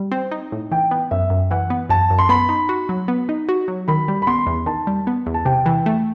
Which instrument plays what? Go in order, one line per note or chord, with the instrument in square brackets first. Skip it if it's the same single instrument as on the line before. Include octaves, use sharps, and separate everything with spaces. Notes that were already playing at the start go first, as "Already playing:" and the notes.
Already playing: [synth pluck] G3
C4
D#4
A2
[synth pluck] E3 [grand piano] G5
[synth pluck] B3
[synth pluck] F#2 [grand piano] E5
[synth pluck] F#2
[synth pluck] E3 [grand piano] F#5
[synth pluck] B3
[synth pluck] F#2 [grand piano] A5
[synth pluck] F#2
[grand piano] C6
[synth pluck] B3 [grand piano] B5
[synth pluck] D#4
F#4
F#3
B3
D#4
F#4
F#3
[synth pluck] D#3 [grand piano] B5
[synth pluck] G3
[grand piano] B5
[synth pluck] B3 [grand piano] C6
[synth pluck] E2
[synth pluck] D#3 [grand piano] A5
[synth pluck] G3
B3
E2
[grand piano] A5
[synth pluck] C3 [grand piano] G5
[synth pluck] E3
A3